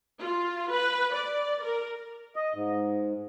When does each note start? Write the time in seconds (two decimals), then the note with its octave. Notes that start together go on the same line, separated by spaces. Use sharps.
0.20 F4
0.71 B4
1.14 D5
1.62 A#4
2.36 D#5
2.54 G#2